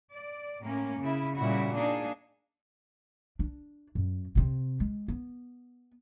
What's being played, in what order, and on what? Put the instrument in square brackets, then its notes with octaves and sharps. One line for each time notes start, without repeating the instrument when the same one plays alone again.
[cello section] D5
A2 A#3 C#4
C#3 E4
A#2 C#3 G3 E4 F#4
A#3 D4 D#4 G#4
[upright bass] D4
F#2
C3 C4
G#3
B3